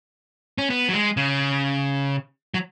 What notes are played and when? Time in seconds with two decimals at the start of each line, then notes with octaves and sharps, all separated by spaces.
0.58 C#4
0.70 B3
0.89 F#3
0.93 G#3
1.17 C#3
2.54 F#3